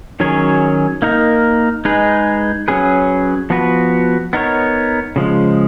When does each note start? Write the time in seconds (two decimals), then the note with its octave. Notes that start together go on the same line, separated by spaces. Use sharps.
0.20 D#3 F#3 C#4 G#4 C#5
1.02 A#3 D#4 A#4
1.85 G#3 D#4 G#4 B4
2.68 F#3 C#4 G#4 B4
3.50 F3 B3 F#4 B4
4.33 B3 D#4 A#4 C#5
5.16 C#3 F3 G#3